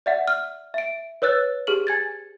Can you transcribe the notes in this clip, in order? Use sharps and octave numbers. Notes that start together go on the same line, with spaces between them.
D5 E5 F#5
F6
E5 D7
B4 C#5 E6 F#6 A6
G4 G#4 F6 F#7
G#5 G#6 A6